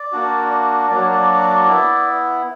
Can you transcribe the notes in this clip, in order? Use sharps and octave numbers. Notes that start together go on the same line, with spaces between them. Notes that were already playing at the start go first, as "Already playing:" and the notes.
Already playing: D5
A#3 D4 F#4
F#3 A#3 D4 F#4 D5
C#5
D5
B3 E4